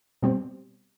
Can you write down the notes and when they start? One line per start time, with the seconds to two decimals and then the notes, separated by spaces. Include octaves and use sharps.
0.23 B2 G3 C4